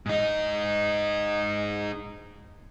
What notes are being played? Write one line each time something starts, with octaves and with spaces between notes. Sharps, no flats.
G#2 D#4